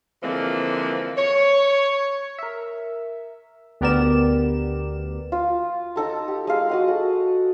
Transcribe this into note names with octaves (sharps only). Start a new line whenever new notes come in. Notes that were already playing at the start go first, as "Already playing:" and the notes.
D3 E3 F3 G#3 A#3 C4
C#5
A#4 E5
D2 B3 G4 A#4 D5 E7
F4
D#4 A4 A#5
G4
G#3 F5
F#4 D#5 F#5
A4